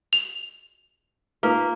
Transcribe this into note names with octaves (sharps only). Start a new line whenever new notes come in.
F7
A#3 D#4 F4 B4